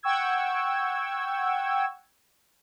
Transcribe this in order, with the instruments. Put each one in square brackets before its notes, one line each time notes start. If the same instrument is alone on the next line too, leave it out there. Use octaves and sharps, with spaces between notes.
[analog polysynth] F#5 G5 C#6 E6 G#6